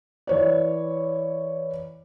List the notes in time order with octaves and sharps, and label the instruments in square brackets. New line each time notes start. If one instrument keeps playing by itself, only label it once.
[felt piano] E3 C#5 D5